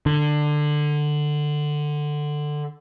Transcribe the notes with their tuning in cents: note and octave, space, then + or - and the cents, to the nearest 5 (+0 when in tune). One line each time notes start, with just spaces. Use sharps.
D3 +15